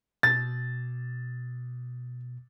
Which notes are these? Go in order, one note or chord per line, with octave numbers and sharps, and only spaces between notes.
B2 A6